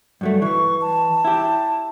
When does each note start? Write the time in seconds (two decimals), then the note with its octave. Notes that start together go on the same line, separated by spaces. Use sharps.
0.21 G2 F#3 A3
0.42 E3 C#6
0.81 A5
1.25 E4 G4